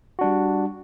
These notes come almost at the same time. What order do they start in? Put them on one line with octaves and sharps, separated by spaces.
F#4 D4 G3